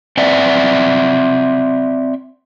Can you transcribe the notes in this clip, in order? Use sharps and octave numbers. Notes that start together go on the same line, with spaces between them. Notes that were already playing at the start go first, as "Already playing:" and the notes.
C4 D5 E5 F#5